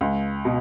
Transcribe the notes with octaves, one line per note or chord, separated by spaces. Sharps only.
C#2
B2